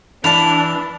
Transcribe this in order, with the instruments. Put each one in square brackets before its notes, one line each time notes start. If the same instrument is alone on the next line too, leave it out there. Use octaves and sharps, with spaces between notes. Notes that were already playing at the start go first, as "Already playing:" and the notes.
[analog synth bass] E3 [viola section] D4 [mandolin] E4 [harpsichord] F5 A5